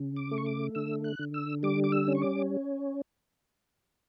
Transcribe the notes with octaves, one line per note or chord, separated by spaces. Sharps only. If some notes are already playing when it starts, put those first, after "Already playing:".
Already playing: C#3
D6
A3
C#6
D6
D3 E6
F#6
D3
E6
G3 D6
D6
E6
C#4
C#6
D6